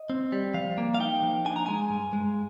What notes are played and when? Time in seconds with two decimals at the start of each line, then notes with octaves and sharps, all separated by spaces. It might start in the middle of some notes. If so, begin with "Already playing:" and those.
Already playing: D#5
0.10 C4
0.32 G3
0.54 F3 F5
0.78 A#3
0.94 F5
1.00 D#4 G5
1.23 F3
1.46 D4 G#5
1.56 A#5
1.66 G#3 G#5
1.90 G2
2.13 G#3